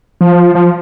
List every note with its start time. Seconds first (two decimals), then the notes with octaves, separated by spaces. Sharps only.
0.21 F3
0.55 F3